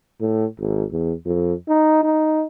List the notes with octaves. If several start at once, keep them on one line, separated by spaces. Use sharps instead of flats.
A2
G#1
E2
F2
D#4
D#4